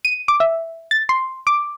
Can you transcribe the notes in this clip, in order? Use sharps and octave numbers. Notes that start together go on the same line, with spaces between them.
D#7
D6
E5
A6
C6
D6